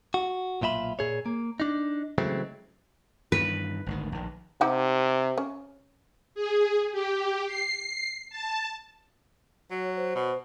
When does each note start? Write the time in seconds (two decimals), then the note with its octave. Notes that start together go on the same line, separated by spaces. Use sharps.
0.14 F#4
0.61 B1 A#2 F4 E5 B5
0.99 A#2 G#4 C#5
1.26 A#3
1.60 D4 D#4
2.18 C#3 E3 F#3 G#3 A3 C4
3.32 G2 D#3 E3 B4
3.86 G#1 D2 D#3
4.12 A#1 D#3
4.61 C3 D#4 G4 F#5
5.38 C#4
6.35 G#4
6.92 G4
7.46 C7
8.30 A5
9.71 F#3 C#5
9.96 C5
10.15 B2